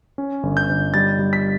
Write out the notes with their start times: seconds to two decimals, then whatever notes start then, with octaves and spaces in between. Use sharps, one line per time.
0.18 C#4
0.43 G1
0.57 G6
0.69 G1
0.94 G3 A6
1.19 G3
1.33 B6